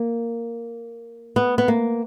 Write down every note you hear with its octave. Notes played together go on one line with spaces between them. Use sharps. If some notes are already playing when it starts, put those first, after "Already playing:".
Already playing: A#3
B3
B3
A#3